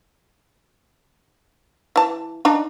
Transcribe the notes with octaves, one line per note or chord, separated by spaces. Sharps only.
E3 A5
D4 D#4